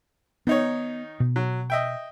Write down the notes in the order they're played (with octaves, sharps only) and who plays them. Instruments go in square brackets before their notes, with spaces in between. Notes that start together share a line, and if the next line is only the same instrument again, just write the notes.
[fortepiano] D#3 D#4 C#5 [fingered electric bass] B3
[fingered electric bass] B2
[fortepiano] F#3
D#5 E5 G5